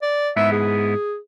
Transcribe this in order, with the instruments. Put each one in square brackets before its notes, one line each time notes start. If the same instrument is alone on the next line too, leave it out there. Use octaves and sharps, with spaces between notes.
[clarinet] D5
[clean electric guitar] G#2 B3 E4 [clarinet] E5
[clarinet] G#4